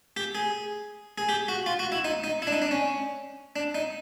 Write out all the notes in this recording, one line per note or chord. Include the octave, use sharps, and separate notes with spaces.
G4
G#4
G#4
G4
F#4
F4
F#4
E4
D#4
D#4
E4
D4
D#4
D4
C#4
D4
D#4